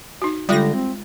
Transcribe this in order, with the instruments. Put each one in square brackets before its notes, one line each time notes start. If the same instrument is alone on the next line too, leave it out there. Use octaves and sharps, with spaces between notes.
[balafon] D#4 F#4
[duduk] D3 [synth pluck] G3 A#6 [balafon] G#3 F4
[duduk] C4